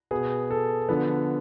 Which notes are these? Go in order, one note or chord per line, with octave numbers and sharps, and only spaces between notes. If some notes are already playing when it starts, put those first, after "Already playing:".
B2 B3 G#4
A4
D3 F3 B3